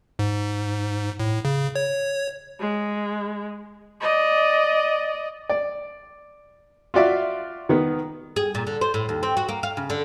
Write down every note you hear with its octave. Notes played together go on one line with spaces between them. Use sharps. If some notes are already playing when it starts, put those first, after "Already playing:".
G#2
A2
C#3
C#5
G#3
D5 D#5
D5
F4 F#4 D5 E5
D#3 B3
G#4
A#2
D3
C5
A2
D#2
C4
F#4
A#3
F5
C#3
D3